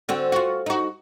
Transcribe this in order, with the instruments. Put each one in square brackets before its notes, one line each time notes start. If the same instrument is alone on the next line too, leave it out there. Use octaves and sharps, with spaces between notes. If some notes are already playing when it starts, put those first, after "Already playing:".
[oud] D3 C4 F#4
F4 F#4
D#4 F#4